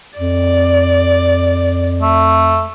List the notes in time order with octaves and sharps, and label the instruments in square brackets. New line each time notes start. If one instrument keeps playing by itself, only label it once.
[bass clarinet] F2 [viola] D5
[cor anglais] A3